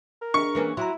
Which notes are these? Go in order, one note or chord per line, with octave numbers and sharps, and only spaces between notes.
A#4
D4 G#4 C#6
E3 A#3 C#4
F#3 E4 A#5 C6